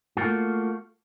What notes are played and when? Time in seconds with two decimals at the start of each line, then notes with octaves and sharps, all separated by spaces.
0.17 A3 A#3 F4 F#4